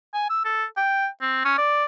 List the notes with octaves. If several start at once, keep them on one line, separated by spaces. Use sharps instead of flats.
G#5
E6
A4
G5
C4
C#4
D5